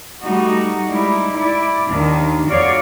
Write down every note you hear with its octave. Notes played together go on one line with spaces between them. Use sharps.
G3 A3 D#4 F#4
G3 G#3 D#4 E4
E4 D5
D#2 D#3 D4
F2 D#4 F#4 C#5 D5 F5